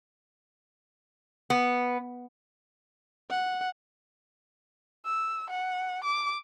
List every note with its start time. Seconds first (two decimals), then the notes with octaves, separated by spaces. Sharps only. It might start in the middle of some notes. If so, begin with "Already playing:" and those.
1.50 B3
3.31 F#5
5.05 E6
5.50 F#5
6.04 D6